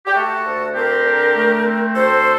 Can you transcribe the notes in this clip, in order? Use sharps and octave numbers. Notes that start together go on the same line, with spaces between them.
G4
A3 F#4 A4
D2
C4 G4 A#4
D3
A3
C4
D2 A4 C5